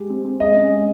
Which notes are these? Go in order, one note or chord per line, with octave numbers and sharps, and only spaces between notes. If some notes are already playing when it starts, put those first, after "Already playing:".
Already playing: G#3 G4
C4
C4
G#3 D#5
C#4
G#3